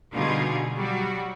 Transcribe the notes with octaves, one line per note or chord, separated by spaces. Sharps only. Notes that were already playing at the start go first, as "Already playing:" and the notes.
B2 D3 G3 D#4 F4 G#4
F#3 G3 F#4